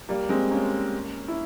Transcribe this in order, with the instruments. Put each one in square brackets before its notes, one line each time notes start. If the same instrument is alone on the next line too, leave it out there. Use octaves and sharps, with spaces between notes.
[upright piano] G3 A#3
G#3 C4
A#3 C#4
E4